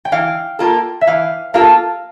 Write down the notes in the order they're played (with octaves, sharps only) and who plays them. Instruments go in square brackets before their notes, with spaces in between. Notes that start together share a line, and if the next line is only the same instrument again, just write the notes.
[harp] G5
[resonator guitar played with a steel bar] E3 [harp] F5
[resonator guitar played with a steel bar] A#3 F4 A4
[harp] E5
[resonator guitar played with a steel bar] E3 [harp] F5
[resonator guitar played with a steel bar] A#3 F4 A4 [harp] F5